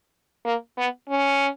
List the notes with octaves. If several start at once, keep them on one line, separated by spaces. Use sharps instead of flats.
A#3
B3
C#4